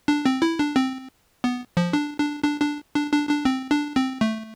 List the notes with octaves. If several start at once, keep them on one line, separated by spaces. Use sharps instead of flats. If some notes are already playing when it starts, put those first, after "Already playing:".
D4
C4
E4
D4
C4
B3
F3
D4
D4
D4
D4
D4
D4
D4
C4
D4
C4
A3